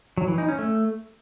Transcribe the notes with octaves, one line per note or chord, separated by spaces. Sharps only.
F#3
E3
D#4
C#4
A3